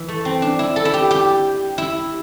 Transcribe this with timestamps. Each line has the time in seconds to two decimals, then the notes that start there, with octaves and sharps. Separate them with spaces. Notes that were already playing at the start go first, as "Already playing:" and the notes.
Already playing: E3
0.08 A3
0.25 C4
0.42 D4
0.59 E4
0.76 A4
0.85 E4
0.94 G4
1.11 G4
1.78 E4